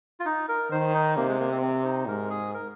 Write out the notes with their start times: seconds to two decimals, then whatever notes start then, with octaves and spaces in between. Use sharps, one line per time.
0.20 F4
0.26 D#4
0.49 A#4
0.71 D#3 C5
0.94 D#4
1.17 C3 A#3
1.28 G#3
1.39 A#3
1.51 C4
1.62 C4
1.85 D#4
2.07 G#2 A#4
2.30 G#4
2.54 A#4